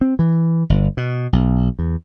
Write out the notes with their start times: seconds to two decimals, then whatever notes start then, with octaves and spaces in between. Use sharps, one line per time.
0.01 C4
0.19 E3
0.70 G1
0.97 B2
1.33 B1
1.79 E2